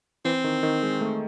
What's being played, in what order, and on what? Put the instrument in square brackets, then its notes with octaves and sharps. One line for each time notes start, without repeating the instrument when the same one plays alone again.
[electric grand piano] E3 [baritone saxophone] C4
[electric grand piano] D#3
D#3
G#3
A3